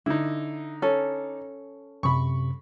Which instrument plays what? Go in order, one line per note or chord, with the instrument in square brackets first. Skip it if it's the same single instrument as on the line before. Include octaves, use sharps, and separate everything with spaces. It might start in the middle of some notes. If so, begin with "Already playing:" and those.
[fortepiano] D3 D#4 [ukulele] E4
[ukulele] C#4 A4
[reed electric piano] F#2 C3 [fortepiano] B5 C#6